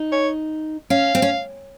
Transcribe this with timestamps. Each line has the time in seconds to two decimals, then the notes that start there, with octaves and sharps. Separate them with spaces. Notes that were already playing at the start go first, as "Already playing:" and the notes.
Already playing: D#4
0.12 C#5
0.90 C#4 F5
1.15 C4
1.22 C#4